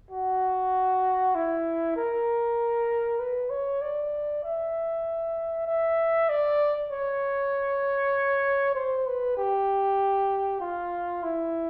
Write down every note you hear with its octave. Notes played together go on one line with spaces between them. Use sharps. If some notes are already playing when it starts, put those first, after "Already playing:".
F#4
E4
A#4
B4
C#5
D5
E5
E5
D5
C#5
C5
B4
G4
F4
E4